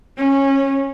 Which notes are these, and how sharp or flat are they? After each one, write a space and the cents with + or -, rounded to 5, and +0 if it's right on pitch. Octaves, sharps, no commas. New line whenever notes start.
C#4 -15